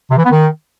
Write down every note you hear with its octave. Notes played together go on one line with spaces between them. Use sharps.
C3
E3
B3
D#3